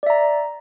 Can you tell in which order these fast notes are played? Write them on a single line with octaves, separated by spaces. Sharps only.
D5 E5 A#5